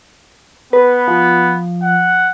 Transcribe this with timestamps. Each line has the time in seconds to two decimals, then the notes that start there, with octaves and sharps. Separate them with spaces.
0.73 B3 B4
1.08 F3
1.83 F#5